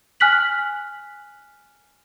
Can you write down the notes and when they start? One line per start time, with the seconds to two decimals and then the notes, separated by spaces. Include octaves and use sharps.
0.20 G#5 F6 F#6 B6 F#7